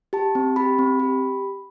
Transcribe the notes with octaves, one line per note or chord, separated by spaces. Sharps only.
G4 A5
C4
G4 B5
C4
G4